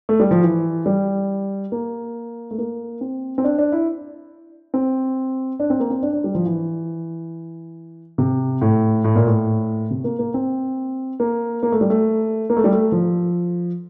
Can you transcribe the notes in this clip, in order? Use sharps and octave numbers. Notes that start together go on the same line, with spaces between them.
A3
G3
F3
E3
G3
A#3
A3
A#3
C4
C4
D4
D4
E4
C4
D4
C4
A#3
C4
D4
D4
G3
F3
E3
C3
A2
A2
A#2
A2
C3
A#3
A#3
C4
A#3
A#3
A3
G3
A3
A#3
A3
G3
A3
F3